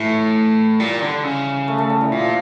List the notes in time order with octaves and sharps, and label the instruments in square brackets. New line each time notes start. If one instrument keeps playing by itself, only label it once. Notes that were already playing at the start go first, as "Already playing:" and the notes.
Already playing: [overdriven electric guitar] A2 [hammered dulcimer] E3
[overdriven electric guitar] A#2 [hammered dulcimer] G3
[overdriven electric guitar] D3
C#3
[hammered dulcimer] A3
A3
G3
E3
[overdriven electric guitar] A#2 [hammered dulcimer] F3